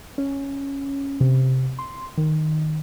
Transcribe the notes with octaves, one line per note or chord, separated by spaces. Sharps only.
C#4
C3
C6
D#3